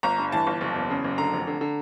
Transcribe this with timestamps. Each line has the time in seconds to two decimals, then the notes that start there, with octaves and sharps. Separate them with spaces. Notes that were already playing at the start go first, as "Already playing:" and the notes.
0.03 G1 A#5
0.18 G2
0.32 E3 A5
0.47 G1
0.61 F#1
0.76 E2
0.90 C#3
1.04 F#1
1.18 D3 A#5
1.33 F1
1.47 D3
1.61 D3